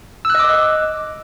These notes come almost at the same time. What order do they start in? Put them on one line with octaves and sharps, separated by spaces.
E6 F#6 D#5 D6